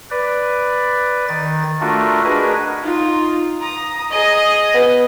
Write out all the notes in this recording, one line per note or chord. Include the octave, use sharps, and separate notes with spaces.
B4 D5
D#3 A6
A3 D4 F4 F#4 A#4
D4 F#4 G#4 A#4 B4 D#5
D#4 F4
A#5 D#6
G#4 D#5
B3